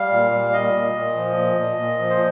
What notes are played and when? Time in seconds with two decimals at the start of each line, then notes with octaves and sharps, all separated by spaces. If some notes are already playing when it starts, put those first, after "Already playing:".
Already playing: G3 F5
0.11 A#2
0.31 G3
0.53 A#2 D#5
0.74 A#2
0.95 A#2
1.16 F3
1.36 A#2
1.57 A#2
1.78 A#2
1.99 F3
2.10 C5